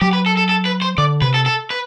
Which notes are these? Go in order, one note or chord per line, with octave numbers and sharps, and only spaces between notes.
F#3 G4
B4
A4
A4
A4
B4
C5
D3 D5
C3 B4
A4
A4
B4